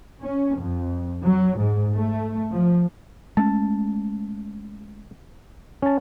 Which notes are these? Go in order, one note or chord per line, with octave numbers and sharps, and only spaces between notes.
C#4
F2
F#3
G#2
A3
F3
G#3 A3 C#4 A5
C#4 A5